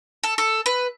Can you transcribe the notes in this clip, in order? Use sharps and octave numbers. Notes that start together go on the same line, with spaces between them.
A4
A4
B4